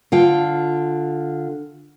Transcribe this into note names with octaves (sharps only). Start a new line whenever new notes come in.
D3 F4 G5